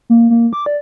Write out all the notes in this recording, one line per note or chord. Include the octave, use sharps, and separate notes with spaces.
A#3
A#3
D6
D5